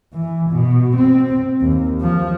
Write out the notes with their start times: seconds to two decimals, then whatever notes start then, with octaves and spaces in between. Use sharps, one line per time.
0.13 E3
0.51 B2
0.96 C4
1.61 D#2
2.01 F3